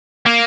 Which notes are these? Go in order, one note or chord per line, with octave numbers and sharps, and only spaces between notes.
A#3